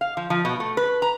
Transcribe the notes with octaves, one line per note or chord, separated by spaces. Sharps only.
F5
F3
F3
B2
A3
B4
A#5